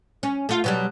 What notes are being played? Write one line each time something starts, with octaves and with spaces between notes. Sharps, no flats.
C#4
A3 F4
B2 F#3 G3